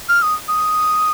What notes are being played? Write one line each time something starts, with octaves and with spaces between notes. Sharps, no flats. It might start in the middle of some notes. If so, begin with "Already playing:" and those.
F6
D#6
D#6